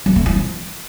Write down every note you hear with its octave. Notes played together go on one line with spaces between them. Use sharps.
F#3
A3
E4
F3